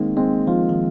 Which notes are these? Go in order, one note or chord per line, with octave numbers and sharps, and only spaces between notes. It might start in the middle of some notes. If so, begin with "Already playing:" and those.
Already playing: D#3 G#3 A#3 C4
G#3 C4
F3 F4
D#3